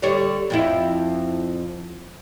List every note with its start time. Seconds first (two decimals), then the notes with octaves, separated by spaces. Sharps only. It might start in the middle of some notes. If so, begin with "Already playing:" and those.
0.02 D3 G3 C#5
0.50 F2 F3 E4